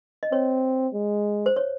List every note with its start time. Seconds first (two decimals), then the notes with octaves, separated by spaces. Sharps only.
0.23 D#5
0.32 C4 C#5
0.93 G#3
1.46 C5
1.56 C#5